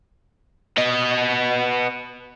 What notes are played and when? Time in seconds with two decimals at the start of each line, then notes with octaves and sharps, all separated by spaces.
0.78 B3 D#5